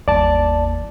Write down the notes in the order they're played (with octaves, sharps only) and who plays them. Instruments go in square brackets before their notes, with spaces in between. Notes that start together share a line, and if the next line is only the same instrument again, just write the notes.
[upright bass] G1 [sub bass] D#2 [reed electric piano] D5 A5